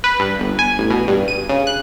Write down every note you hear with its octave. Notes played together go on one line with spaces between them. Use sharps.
B4
G2
G1
G#5
A1
B2
G2
D#7
C#3
F#6